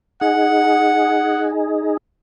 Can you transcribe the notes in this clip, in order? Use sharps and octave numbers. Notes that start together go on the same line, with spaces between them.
D#4 G#4 F#5